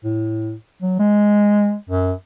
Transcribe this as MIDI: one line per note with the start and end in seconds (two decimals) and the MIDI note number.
0.04 0.53 45
0.82 0.96 54
0.99 1.75 56
1.90 2.12 42